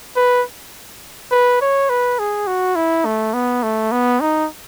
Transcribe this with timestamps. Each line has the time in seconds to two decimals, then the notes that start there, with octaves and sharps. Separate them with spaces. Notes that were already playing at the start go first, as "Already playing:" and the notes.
0.16 B4
1.31 B4
1.61 C#5
1.89 B4
2.19 G#4
2.47 F#4
2.76 E4
3.05 A3
3.34 B3
3.63 A3
3.92 B3
4.20 D#4